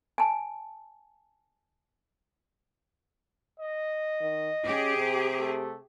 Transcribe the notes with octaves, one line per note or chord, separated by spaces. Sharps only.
G#5 A5
D#5
D#3
C#4 G4 G#4
C3
A3